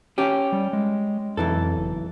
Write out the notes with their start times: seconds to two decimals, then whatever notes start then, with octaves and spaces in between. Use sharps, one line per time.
0.18 C#4 G4
0.52 G3
0.73 G#3
1.37 B1 F2 E3 A4
1.77 F#1